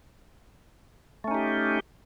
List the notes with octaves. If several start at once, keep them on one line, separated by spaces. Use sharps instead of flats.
A3 C#4 D#4 G4